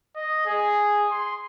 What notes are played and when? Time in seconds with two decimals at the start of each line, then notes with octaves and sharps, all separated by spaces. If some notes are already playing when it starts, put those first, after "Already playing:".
0.16 D#5
0.46 G#4
1.12 C6